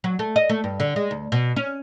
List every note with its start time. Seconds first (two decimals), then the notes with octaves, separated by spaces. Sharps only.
0.04 F#3
0.19 A3
0.36 D#5
0.50 A3
0.64 G2
0.80 D3
0.96 G#3
1.11 D2
1.32 B2
1.56 C#4